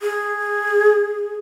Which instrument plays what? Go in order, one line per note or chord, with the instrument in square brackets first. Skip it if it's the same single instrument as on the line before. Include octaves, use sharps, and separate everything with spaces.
[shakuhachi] G#4